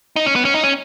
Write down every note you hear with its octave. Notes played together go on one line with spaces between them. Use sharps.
D#4
C#4
B3
C#4
D#4
C#4